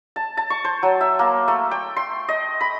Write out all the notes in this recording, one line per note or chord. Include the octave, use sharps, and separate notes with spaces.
A5
A5
C#6
C5
F#3
E5
A#3
A3
G5
C6
D#5
B5